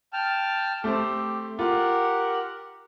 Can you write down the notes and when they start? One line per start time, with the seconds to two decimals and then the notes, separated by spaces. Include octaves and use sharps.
0.13 G5 A5 F6
0.84 A3 C4 G4
1.59 F4 G4 A#4 F#5